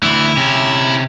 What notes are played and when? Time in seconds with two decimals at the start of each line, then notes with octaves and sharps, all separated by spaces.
0.03 D2 E3 E4
0.37 C3 C#4